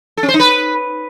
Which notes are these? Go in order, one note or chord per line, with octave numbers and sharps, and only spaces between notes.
A4
C#4
C5
D#4
B4